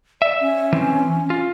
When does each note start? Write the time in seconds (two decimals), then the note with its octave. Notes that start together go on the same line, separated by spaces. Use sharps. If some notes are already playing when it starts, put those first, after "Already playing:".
0.22 D5 E5
0.40 C#4
0.73 E3 C4
1.30 F4